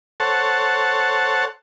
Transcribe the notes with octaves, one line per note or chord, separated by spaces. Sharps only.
A4 C5 C#5 F#5 A5